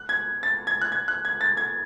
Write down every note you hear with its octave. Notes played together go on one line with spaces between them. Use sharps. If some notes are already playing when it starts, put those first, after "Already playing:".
Already playing: F#6
G#6
A6
G#6
F#6
G#6
F#6
G#6
A6
G#6